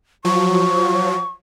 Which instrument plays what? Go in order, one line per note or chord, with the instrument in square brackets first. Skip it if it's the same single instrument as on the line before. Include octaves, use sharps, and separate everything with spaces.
[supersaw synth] F3 F#3 [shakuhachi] C#6